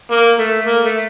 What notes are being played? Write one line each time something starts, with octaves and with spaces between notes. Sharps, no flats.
A#3
A3
A#3
A3